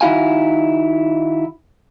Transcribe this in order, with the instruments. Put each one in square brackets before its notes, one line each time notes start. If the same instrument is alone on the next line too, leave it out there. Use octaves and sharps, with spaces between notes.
[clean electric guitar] D#3 D#4 E4 F#4 F5 G#5